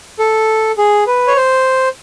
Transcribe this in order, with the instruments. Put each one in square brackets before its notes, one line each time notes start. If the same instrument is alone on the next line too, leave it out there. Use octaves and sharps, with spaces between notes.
[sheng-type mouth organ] A4
G#4
B4
C#5
C5